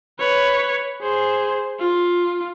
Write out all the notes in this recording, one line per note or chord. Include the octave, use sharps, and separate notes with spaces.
B4 C#5
G#4 C5
F4